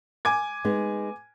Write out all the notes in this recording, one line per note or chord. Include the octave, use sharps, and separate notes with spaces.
G#5 D6 G#6
G#3 B3 D#4